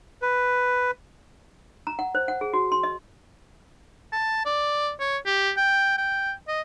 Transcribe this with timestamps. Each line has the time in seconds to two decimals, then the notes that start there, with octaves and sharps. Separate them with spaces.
0.22 B4
1.87 A#5
1.99 F#5
2.15 C5
2.28 F#5
2.41 G#4
2.53 F#4
2.72 C6
2.83 D#5
4.12 A5
4.46 D5
5.00 C#5
5.26 G4
5.57 G5
5.98 G5
6.48 D#5